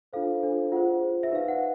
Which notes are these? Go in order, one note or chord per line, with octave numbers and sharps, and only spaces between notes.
D4 F4 A4 C5 F5
D4 F4 A4 C5
F4 G#4 C5 F#5
F4 G#4 C5
E5
D#4 G4 B4 D5 F5
F#5